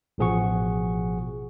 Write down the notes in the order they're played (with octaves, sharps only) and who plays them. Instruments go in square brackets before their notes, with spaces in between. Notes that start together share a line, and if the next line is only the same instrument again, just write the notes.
[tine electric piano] A1 B2 F3 G#4 F#5 C#6